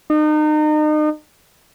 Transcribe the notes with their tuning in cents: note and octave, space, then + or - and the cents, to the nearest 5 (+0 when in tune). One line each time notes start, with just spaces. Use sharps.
D#4 -35